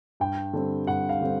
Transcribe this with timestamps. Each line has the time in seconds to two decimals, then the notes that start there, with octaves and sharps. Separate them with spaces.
0.20 G2 G5
0.53 D3 G3 C4
0.87 G2 F#5
1.09 F5
1.21 D3 G3 C4